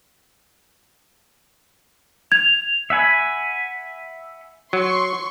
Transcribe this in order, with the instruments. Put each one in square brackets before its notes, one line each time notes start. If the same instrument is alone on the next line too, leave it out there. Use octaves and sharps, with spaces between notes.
[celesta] G#6 [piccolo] F7
[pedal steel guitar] E5 F#5 G#5 B5
[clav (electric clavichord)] F#3 [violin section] C6 C#6